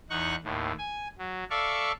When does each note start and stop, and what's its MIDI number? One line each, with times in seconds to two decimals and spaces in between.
0.10 0.35 40
0.10 0.35 63
0.10 0.35 78
0.10 0.35 85
0.10 0.35 90
0.44 0.72 39
0.44 0.72 45
0.78 1.08 80
1.18 1.44 54
1.50 1.92 69
1.50 1.92 74
1.50 1.92 76
1.50 1.92 77
1.50 1.92 85